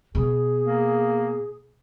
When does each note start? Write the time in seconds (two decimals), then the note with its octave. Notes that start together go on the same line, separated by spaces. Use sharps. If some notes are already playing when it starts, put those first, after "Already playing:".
0.15 B2 G#4
0.63 A#3